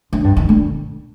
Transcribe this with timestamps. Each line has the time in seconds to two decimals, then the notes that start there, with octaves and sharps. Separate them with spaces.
0.13 D3
0.24 G2
0.37 D#3
0.49 D3